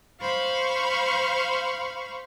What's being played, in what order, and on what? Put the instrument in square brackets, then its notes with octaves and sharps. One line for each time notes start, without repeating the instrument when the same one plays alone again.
[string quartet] C5 F5 B5 C#6